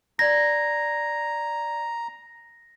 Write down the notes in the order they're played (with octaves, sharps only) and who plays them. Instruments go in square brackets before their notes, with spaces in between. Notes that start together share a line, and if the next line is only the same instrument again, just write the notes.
[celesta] D5 G#6 [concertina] A#5 [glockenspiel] A#6